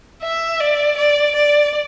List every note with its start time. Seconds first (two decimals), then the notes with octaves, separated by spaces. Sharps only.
0.22 E5
0.60 D5
0.98 D5
1.35 D5